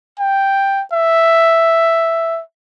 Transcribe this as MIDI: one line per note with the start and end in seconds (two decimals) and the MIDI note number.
0.19 0.82 79
0.93 2.41 76